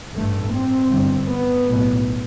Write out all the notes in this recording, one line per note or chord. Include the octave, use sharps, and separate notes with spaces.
A1 G2 A3
C4
G1 G2
B3
B1 A2